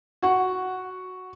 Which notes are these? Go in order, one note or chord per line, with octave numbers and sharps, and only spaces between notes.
F#4 F#5